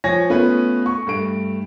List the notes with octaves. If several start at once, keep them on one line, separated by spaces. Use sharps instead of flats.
F3 C#5 G#5 A#6
A3 B3 C#4 F4 B4
C#6
G2 A3 D7